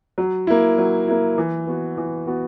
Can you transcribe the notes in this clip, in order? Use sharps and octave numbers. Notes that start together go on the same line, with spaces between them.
F#3
A#3 E4
F#3
A#3 E4
E3
B3 F#4
E3
B3 F#4